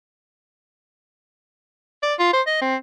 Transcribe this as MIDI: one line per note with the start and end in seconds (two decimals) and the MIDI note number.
2.03 2.14 74
2.19 2.32 65
2.33 2.42 72
2.47 2.58 75
2.62 2.76 60